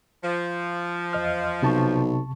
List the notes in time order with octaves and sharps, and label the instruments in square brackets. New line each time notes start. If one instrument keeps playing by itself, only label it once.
[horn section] F3
[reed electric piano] E2 D#5 F6
[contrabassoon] B1 [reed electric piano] C3 A5 C#6